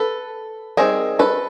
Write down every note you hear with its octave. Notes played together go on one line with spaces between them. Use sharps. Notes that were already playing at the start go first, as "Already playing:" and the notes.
Already playing: A4 B4
G3 C4 D#4 G#4 A#4
A4 B4